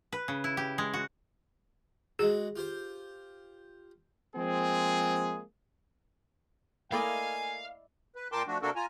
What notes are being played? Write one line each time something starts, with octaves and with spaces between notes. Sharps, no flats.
B4
C#3
E4
G4
G#3
F#4
G#3 F#4 G#4
F4 G4 C5
F3 G#3 A#3 C4 G#4
A3 A#3 E4 D5 D#5 F5 G#5
B4
A#2 A#4 G5 A5 C6 D6
F3 A3 D4 F#4
C3 A#3 D4 F#4 A4 A#4
F4 G#5 A#5